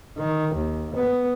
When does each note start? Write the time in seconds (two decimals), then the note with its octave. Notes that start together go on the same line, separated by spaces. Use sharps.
0.18 D#3
0.55 D#2
0.95 B3